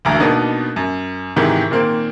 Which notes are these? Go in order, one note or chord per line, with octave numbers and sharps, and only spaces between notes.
E1 D2 A#5
B2 A#3 B3 D4 D#4
F#2
G#2 C3 D#3 E3
A#2 D#3 A#3 C4